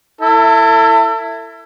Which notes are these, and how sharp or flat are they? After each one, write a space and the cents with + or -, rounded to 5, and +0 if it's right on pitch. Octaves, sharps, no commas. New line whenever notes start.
E4 +10 A4 +35